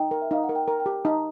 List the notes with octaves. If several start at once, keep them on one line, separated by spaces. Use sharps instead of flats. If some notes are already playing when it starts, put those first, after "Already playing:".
Already playing: D#4 G5
A#4
E5
D#4 F5
F#5
A#4
G5
A#4
G5
G4
D#4 A5